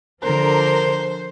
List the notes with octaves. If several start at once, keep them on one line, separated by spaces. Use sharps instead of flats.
D3 F3 A#4 C5